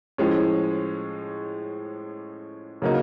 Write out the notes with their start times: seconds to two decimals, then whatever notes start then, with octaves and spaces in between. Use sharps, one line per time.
0.18 A2 F3 G#3 C#4
2.82 C#3 F#3 A#3 D#4 F#4